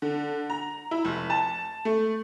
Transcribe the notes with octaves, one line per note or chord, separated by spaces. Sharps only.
D3
A#5
E4
F1
A5
A3